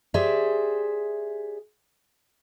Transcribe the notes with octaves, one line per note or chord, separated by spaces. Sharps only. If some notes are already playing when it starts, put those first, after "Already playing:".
G4 G#4 C5 D5 E5